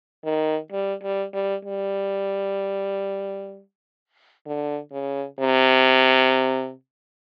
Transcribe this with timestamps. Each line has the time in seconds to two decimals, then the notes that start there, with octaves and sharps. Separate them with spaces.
0.25 D#3
0.72 G3
1.03 G3
1.34 G3
1.65 G3
4.46 D3
4.92 C#3
5.40 C3